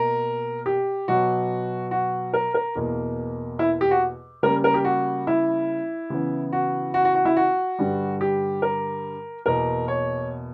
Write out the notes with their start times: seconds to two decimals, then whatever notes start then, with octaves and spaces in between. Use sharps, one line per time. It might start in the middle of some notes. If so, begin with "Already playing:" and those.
Already playing: B2 A#3 A#4
0.66 G4
1.08 B2 F#3 B3 F#4
1.91 F#4
2.34 A#4
2.54 A#4
2.75 E2 B2 A#3
3.59 E4
3.81 G4
3.91 F#4
4.43 C#3 G3 A#3 A#4
4.64 A#4
4.74 G4
4.85 F#4
5.27 E4
6.10 C#3 E3 B3
6.53 F#4
6.94 F#4
7.05 F#4
7.15 F#4
7.25 E4
7.37 F#4
7.79 G2 D3 G3
8.21 G4
8.62 A#4
9.46 E2 B2 A#3 A#4
9.88 C#5